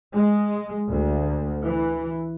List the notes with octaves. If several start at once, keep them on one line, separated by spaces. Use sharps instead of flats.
G#3
D2
E3